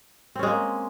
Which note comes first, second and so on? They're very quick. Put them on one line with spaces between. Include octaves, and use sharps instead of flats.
C4 C#4 G#3 A#3